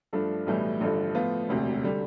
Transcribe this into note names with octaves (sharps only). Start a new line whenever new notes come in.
G2 F3 A3 D4 A4
B1 A2 E3 G3
A1 G2 D3 F3 A3
A2 F3 B3 F4
E1 D2 C3
D3 G3